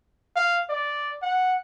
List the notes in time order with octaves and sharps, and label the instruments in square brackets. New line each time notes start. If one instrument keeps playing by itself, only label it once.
[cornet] F5
D5
F#5